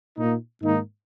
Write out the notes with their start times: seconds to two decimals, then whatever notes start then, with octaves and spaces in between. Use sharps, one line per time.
0.18 A#2 A#3 D#4
0.61 G#2 D#3 A#3 D#4